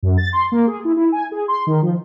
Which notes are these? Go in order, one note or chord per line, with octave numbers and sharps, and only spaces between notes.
F#2
A6
C6
A#3
G#4
E4
E4
G#5
G#4
C6
D#3
F3